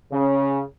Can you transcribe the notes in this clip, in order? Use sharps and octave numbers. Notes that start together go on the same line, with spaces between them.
C#3